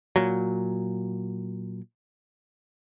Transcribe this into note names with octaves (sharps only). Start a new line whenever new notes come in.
A#2 F#3